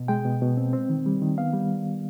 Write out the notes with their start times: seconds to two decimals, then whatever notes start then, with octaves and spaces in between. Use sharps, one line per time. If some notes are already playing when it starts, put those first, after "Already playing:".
Already playing: B2
0.08 G#3 G5
0.25 B2
0.42 B2
0.57 C4
0.73 C4
0.90 D#3
1.06 G3
1.21 D#3
1.38 B3 F5
1.54 G3